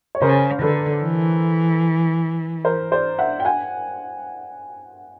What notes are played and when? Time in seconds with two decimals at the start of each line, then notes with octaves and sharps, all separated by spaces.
0.15 C#5
0.22 C#3 A#4 C5
0.62 D3 A4 B4
1.03 E3
2.65 A#4 C5
2.92 C5 D5
3.18 E5 F#5
3.40 G5
3.45 F#5 G#5